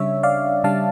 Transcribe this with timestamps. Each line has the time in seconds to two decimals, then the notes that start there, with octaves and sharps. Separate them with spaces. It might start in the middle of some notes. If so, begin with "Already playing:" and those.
Already playing: C#3 G3 D4 C#5 E5
0.23 D5 F5
0.64 C#3 G3 D4 F5 A5